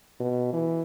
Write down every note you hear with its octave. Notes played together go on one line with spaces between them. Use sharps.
B2
E3